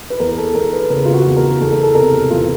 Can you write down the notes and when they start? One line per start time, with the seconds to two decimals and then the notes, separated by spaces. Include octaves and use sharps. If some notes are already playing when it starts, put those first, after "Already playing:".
0.10 B4
0.20 E2 A#4
0.38 A4
0.54 E2 A#4
0.73 B4
0.90 C#3 A#4
1.05 F4
1.13 F#4
1.26 E2
1.37 A#4
1.60 E2 A4
1.72 A#4
1.83 A4
1.95 C3 A#4
2.30 E2 F4